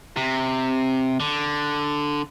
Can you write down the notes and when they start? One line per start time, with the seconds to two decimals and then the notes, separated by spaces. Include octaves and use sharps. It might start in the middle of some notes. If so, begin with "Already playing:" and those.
0.17 C3
1.20 D3